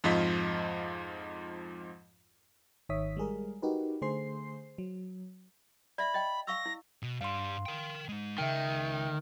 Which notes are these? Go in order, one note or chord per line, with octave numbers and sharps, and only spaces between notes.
F2 G#2 F3 F4 D#5 B6
G#1 D#3 C#5 E5 D#6 B6
G3 G#3 G#4 A#4
D#4 F#4 G4 A#4 B4
D3 A3 G#4 C5 C6 C7
F#3
D5 E5 B5
D#5 G5
F5 C#6 E6 A#6
E4
B2
G2 G3 F5 C6
A#4 G5
G#3 D#4
C#2 D#3 E5 G5